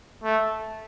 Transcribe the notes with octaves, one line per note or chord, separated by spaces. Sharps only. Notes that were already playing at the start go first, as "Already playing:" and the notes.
A3